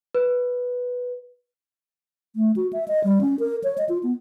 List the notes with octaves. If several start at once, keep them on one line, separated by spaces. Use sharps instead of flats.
B4
A3
F#4
E5
D#5
G3
C#4
A#4
C#5
D#5
F4
B3